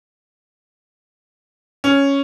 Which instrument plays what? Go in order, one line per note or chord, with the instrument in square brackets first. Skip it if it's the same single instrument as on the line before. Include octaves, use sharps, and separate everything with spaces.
[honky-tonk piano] C#4